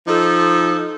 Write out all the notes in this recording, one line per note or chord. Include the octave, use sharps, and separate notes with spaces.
F3 D#4 A4